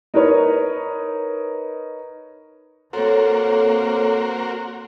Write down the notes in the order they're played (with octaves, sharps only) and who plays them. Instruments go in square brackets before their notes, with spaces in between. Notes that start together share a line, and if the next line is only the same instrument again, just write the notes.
[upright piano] D#4 A#4 B4 C#5
[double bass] A#3 C4 [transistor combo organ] F#4 A#4 C5 [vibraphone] A4 C#5